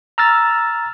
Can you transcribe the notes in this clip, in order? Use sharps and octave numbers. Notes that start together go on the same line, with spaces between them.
A#5 E6 F6 A6